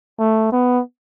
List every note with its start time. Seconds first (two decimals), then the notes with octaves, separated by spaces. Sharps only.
0.19 A3
0.52 B3